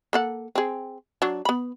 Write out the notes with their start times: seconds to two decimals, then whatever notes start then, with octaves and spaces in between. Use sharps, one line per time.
0.13 A#3 A4 F#5
0.55 C4 G#4
1.22 F#3 D4
1.45 B3 B5